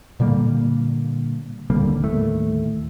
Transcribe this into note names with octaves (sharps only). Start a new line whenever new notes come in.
A#2 D3 G3 A#3
D#1 D3 G3 A#3
D#2 A2 A3